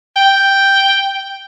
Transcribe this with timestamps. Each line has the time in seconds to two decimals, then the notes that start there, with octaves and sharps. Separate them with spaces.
0.16 G5